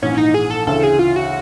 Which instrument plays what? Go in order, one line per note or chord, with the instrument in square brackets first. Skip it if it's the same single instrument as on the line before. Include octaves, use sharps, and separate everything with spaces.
[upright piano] A#1 G#2 E3 [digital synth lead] C#4
[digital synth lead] D#4
G#4
A4
[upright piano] D2 C#3 E3 [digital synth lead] A4
[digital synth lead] G#4
F4
F#4